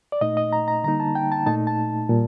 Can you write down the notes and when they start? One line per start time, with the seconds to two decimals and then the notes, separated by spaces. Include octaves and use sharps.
0.12 D5
0.21 A#2 A3 D#4 D#5
0.37 D#5
0.53 A#5
0.68 A#5
0.84 D3 G3 A#3 D#4 A#5
1.00 A5
1.15 G5
1.32 A5
1.46 A#2 A3 D#4 A5
1.67 A5
2.10 A#2 G3